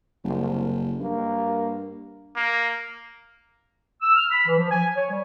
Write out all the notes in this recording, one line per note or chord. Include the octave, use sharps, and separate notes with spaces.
F#1 C2
G2 A#3
A#3
E6
F6
B5
E3
F3
G#5
C#5
G3